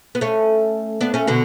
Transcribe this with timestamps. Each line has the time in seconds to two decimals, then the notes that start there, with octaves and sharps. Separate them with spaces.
0.15 B3
0.21 A3 C#4
1.01 B3 D4
1.14 A3 C#4
1.27 B2 D3